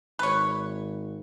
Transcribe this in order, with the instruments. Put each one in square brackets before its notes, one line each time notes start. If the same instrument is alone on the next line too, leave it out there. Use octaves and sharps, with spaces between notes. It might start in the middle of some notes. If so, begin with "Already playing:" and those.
[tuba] G#1 [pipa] B4 C#5